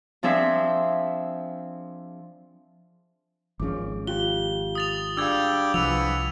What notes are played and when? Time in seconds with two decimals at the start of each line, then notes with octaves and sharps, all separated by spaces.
0.23 F3 C4 D4 G#4 E5
3.60 G#1 F3 C#4 G#4 D6
4.07 F4 G4 G5 G7
4.75 D#6 A6 F7
5.17 G3 D4 G#4 F5 G5 D6 E6 G#6
5.74 C2 E3 F3 B3 E6 F7